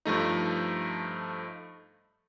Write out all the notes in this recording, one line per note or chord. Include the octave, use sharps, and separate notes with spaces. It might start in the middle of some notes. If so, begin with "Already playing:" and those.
G2 F3 A3 D#4